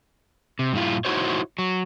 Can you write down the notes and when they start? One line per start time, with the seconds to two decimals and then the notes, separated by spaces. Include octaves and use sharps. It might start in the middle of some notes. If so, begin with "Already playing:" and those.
0.59 C3
0.73 G2 A#2 C4 E4 F4
1.05 D#4 E4 F#4 C5 C#5
1.58 F#3